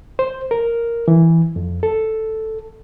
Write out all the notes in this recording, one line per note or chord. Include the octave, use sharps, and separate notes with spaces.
C5
A#4
E3
F2
A4